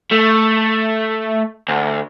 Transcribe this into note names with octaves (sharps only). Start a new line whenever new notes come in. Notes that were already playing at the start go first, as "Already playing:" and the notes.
A3
D2